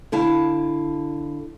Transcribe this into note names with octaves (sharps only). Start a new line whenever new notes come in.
D3 E4 F5 A5